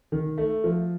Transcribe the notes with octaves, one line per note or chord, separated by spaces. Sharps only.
D#3
A3
F3